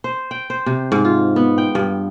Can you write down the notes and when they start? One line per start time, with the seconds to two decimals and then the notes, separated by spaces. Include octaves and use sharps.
0.04 C5
0.31 G5
0.50 C5
0.66 C3
0.92 G#2
1.05 F4
1.36 B3
1.58 G5
1.75 G2